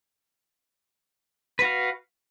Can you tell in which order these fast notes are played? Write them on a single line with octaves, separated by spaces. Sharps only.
B4 F#4 F5